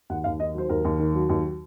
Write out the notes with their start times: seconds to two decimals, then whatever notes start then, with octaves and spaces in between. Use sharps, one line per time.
0.10 D#2 F#5
0.24 D#2 F5
0.40 D#3 D#5
0.54 F#3 C5
0.69 D#2 A#4
0.85 D#2
0.99 D#3
1.14 F#3
1.29 D#2